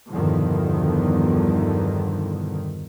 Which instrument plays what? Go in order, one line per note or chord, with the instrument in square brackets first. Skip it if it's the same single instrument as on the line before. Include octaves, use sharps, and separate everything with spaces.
[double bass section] E2 G2 B2 D3 D#3 F3